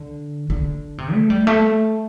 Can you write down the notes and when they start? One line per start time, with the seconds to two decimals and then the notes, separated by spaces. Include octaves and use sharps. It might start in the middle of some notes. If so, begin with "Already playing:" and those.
Already playing: D3
0.50 D3
0.98 C3
1.14 A3
1.30 G3
1.47 A3